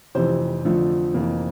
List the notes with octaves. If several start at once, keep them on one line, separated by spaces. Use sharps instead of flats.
F1 F2 C3 E3 C5
F2 D3 F3 A3
F1 F2 E3 A#3